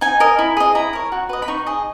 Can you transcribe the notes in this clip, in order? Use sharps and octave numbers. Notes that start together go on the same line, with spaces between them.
D#4 G#5
A#4 D#5
E4
G#4 D#5
E4 A#5
A#4 C#5
F#4
B4 D#5
B5
D#4 C#6
G#4 D#5